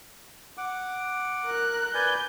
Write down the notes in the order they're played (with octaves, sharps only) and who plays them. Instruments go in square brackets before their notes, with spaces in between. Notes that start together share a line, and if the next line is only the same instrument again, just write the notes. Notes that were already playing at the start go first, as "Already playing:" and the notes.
[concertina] F#5 D6
[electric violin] A#4 F#6
[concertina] B4 D5 G#5 [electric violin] G6